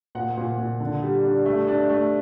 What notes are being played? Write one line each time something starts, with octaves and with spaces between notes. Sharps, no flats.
A#2 F#5
A#2
A#2
D3
G3
D4
A3
D4
A3